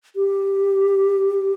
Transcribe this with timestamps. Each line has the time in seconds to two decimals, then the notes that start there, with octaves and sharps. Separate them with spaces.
0.16 G4